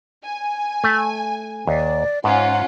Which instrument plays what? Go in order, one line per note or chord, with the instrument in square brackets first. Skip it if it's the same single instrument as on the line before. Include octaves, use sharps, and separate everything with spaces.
[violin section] G#5
[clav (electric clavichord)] A3
[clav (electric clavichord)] D#2 [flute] D5
[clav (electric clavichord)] G#2 [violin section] C#4 F4 [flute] F#5